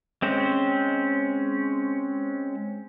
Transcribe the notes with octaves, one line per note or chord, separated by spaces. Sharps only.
G#3 C4 C#4 C5